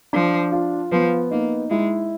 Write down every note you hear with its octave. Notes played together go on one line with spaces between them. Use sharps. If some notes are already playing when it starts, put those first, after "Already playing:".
F3 D4
F4
F3 B3
A#3 D#4
G#3 E4